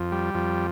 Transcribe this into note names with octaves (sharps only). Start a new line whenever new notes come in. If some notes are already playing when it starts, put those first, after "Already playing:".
Already playing: F2
G3
F2